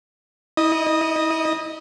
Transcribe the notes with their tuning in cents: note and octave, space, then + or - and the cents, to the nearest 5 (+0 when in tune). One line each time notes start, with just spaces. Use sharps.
E4 -40 D#5 -15 D#6 +0